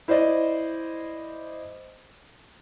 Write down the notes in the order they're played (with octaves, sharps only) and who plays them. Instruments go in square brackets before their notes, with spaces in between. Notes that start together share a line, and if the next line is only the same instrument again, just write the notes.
[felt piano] E4 C5 D5 D#5